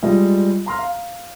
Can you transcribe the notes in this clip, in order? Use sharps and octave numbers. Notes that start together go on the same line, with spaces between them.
G3 G#3 F4 D#5
A#5 C6 F6
F5